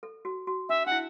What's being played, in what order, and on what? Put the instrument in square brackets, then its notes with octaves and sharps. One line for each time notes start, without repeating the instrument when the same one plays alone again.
[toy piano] A4
F#4
F#4
[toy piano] D4 [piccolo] E5
[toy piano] D4 [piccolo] F#5
[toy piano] E4